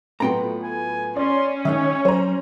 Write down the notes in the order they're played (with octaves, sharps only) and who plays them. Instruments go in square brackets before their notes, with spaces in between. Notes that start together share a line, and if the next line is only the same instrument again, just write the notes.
[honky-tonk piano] A2 F#3 B3 [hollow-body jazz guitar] F4 G5 A#5
[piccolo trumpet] G#5
[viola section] C#4 [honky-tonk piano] D5 [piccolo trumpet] C6
[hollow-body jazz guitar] D#3 G#3 D#4 [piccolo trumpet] C#5 [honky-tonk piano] E5
[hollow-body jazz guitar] F#3 [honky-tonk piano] C5 A#5